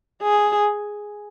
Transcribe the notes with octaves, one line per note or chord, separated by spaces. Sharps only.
G#4